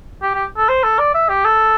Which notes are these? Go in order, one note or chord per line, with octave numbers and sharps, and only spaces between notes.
G4
G4
A4
C5
A4
D5
E5
G4
A4